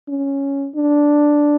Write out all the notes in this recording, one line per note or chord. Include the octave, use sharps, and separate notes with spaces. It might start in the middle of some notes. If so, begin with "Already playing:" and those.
C#4
D4